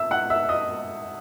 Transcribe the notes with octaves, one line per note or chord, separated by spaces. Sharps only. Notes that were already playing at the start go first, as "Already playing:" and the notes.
Already playing: E5 E6
F#5 F#6
E5 E6
D#5 D#6